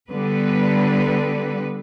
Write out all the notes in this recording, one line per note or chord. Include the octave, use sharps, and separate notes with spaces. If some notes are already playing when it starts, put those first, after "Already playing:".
D3 G3 B3 B4